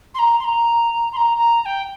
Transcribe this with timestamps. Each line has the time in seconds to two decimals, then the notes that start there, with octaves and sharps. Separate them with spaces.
0.14 C6
0.19 A#5
0.39 C6
0.44 A#5
1.12 C6
1.16 A#5
1.37 A#5
1.62 A#5
1.65 G5